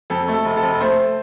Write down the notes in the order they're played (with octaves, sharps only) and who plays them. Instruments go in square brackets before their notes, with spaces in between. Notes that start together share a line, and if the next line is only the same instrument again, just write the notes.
[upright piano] F2 A4
A3
A4
F1
A4
F1
A3 C5